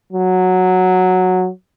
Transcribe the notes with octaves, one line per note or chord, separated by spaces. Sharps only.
F#3